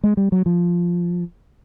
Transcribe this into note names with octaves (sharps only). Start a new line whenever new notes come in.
G#3
G3
F#3
F3